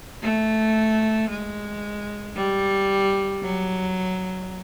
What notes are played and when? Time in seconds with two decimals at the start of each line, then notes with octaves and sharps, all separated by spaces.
0.23 A3
1.30 G#3
2.36 G3
3.42 F#3